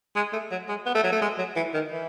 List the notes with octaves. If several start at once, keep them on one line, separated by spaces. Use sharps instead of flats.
G#3
A3
F#3
G#3
B3
A3
F#3
A3
G#3
F#3
E3
D#3
E3